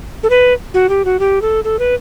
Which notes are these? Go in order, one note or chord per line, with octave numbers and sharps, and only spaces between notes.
A4
B4
F#4
G4
F#4
G4
A4
A4
B4